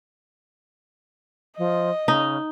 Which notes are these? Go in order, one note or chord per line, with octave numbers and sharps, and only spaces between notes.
F3 D#5
C#3 D#4